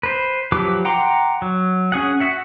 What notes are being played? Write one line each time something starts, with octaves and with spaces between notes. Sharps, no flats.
B4 C5
F3 F#3 G4 B4 D6
F#5 G5 A#5 C6 D6
F#3
C#4 G#4 F#5
F#4 E5 F#5